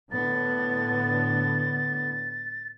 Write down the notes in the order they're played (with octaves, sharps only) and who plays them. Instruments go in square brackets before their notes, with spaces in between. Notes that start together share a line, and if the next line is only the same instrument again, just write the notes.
[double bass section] A2 D3 B3 [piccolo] A6